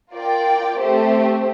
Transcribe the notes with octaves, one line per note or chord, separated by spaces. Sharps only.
F4 A#4 D5 G5
A3 C4 G4 C5